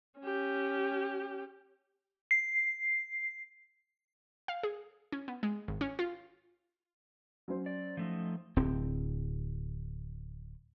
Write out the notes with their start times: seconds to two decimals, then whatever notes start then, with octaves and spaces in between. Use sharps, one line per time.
0.19 C#4 G4
2.31 C7
4.48 F5
4.63 G#4
5.12 C#4
5.28 B3
5.43 G#3
5.68 G#1
5.81 C#4
5.99 F4
7.48 F#3 C#4 C5
7.66 D5
7.97 F3 A3 D#4
8.56 D1 C4